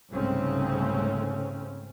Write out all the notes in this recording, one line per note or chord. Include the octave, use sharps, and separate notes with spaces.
C2 G#2 C#3 A3 C4 C#4